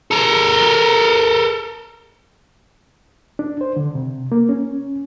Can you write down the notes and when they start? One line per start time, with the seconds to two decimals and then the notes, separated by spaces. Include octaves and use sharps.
0.11 A4 A#4
3.39 D4
3.61 C5
3.77 D3
3.95 C3
4.32 A#3
4.49 C#4